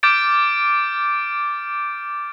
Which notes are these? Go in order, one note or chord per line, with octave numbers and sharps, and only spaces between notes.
D6 F6 G6 A6 D7